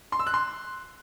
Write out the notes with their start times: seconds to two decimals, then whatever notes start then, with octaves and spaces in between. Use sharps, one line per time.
0.12 C6
0.19 E6
0.27 F#6
0.34 C6